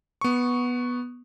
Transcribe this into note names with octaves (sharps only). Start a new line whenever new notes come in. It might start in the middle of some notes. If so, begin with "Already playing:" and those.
B3 C#6